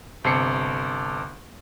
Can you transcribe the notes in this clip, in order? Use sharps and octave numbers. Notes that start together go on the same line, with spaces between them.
G1 C3 A5 C7 C#7